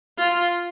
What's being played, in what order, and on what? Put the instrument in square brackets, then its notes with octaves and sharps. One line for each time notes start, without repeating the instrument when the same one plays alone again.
[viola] F4